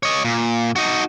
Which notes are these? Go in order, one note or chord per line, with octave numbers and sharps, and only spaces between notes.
C#5 D#5
A#2
D#4 F#4